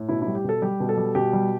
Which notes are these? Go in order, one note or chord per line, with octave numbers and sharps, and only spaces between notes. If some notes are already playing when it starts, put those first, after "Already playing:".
Already playing: A2
B2 E4
G3 E4
G4
B2 A4
G3 G4
B2
A4
G3
B2 G4
G3